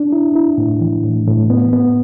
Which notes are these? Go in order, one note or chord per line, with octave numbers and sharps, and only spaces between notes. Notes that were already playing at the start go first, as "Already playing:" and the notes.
Already playing: D4
E4
E4
A2
E3
A2
A2
B3
B3